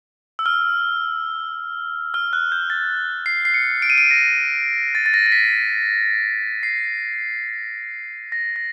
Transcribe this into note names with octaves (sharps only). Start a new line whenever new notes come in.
E6
F6
F6
F#6
G6
A6
C7
C7
C#7
D7
D#7
D7
A#6
A6
A6
A#6
A#6
B6
C7
A#6
A#6